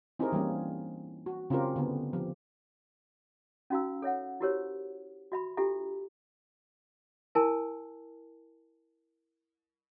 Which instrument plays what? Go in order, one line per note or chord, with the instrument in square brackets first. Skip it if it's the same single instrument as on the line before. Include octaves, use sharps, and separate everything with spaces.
[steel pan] C4 D#4 E4 G4 G#4 A#4
E3 G3 A#3 C#4
F#4
C#3 C4 C#4 F4 G4 A#4
D3 B3
F3 G4
[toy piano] C#4 D#4 F#4 F5 A#5 E6
A4 C#5 E5 F#5
E4 F#4 G4 A#4 C5 C#5
F#4 E5 B5 C6
D4 F4 G4 A4 E5 A#5
E4 A#4 G#5 A5